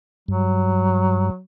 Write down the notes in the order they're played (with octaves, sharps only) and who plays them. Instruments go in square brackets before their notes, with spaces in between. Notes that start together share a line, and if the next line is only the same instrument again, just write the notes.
[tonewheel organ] G2 [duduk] F#3